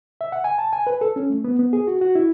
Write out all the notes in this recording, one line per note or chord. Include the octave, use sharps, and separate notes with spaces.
E5
F#5
G#5
A5
G#5
B4
A4
C#4
A3
B3
B3
G#4
F#4
F#4
E4